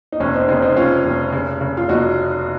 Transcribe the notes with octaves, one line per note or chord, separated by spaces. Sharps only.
D#4
F1 C#4
C4 D#4
C#3 C4 D#4
C4 D#4
F1 C#4 F4
F1
C#3
C#3
F4
F1 D#4 F#4